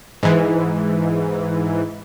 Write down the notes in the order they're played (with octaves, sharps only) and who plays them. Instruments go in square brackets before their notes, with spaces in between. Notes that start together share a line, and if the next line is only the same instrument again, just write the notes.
[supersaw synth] G#2 E3